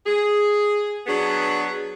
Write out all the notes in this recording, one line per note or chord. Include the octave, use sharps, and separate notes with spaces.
G#4
F#3 B3 D4 G#4